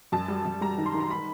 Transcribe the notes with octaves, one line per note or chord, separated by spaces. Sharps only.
F#2 A5
G3
F#2
G3 A#5
D#3
C6
D#3
A#5
B5